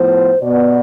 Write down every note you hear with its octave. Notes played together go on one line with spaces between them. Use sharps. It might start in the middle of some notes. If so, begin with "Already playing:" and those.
Already playing: A2 F3 B3 C5
B2 B3 D5